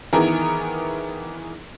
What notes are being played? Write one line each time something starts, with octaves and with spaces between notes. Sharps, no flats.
D#3 E3 B3 G#4 A#4